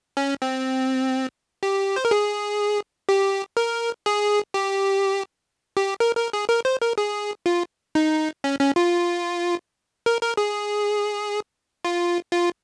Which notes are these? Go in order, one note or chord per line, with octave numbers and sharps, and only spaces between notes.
C#4
C4
G4
C5
A#4
G#4
G4
A#4
G#4
G4
G4
A#4
A#4
G#4
A#4
C5
A#4
G#4
F4
D#4
C#4
C#4
F4
A#4
A#4
G#4
F4
F4